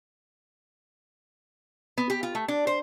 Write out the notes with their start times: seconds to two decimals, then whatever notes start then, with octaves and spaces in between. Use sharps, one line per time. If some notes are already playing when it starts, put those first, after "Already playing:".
1.98 B3
2.10 G4
2.23 F4
2.35 A3
2.48 D4
2.67 C5